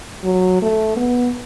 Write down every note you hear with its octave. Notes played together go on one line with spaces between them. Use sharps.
F#3
A3
B3